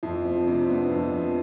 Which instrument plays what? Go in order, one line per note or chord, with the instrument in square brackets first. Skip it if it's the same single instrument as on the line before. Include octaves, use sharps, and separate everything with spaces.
[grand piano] F2 [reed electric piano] E4
[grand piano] F3 [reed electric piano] C4
[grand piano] C3 [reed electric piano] D4
[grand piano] B3 [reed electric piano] D4
[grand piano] F2
F3